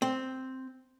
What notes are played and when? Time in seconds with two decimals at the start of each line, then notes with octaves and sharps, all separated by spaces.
0.02 C4